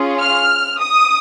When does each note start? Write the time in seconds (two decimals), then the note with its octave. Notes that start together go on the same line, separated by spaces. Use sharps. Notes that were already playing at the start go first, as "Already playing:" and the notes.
Already playing: C#4 F4 G#4
0.21 F6
0.80 D#6